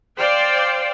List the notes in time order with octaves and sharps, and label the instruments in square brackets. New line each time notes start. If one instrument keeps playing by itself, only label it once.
[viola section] C5 D5 F5 G5